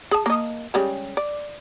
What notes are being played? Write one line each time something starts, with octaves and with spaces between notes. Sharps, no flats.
G#4 A5
A#3 D#5
C#3 G3 G#3
D5